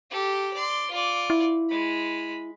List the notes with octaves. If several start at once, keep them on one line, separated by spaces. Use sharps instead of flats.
G4 A4
D5 C6
F4 D5
E4
G#3 B5